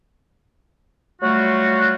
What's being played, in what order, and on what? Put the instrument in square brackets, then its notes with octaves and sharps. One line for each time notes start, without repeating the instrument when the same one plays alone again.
[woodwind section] F#3 G3 A3 F4 F#4